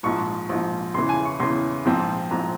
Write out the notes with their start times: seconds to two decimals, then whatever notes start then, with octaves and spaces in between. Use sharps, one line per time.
0.03 A#1 G#2 F3 C#6
0.49 A#1 G#2 F3
0.94 E2 C#3 E3 C6
1.09 G#5
1.25 C#6
1.40 E2 C#3 E3 C6
1.85 A#1 G#2 F3 C4
2.31 A#1 G#2 F3 C4 A#5